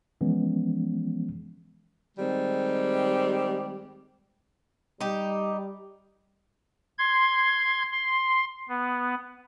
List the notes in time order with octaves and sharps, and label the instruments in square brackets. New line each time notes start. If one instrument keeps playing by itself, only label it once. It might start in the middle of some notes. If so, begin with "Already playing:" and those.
[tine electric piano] E3 F3 G#3 B3 C#4
[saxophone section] D#3 G3 G#3 C4
[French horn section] G3 [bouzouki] D#4 G4
[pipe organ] C6 G#6
C6
B3